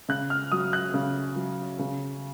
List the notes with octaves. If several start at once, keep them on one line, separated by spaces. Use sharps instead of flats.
C#3 F#6
F6
F#3 D#6
F#6
C#3
F#3
C#3